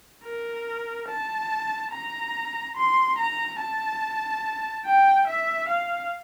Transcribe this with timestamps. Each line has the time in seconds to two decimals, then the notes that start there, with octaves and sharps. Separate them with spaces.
0.24 A#4
1.08 A5
1.92 A#5
2.76 C6
3.18 A#5
3.60 A5
4.85 G5
5.28 E5
5.69 F5